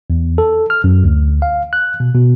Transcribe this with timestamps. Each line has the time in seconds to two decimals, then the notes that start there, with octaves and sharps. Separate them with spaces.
0.10 E2
0.38 A4
0.70 F6
0.84 F#2
1.04 D2
1.42 F5
1.73 F#6
2.00 B2
2.15 B2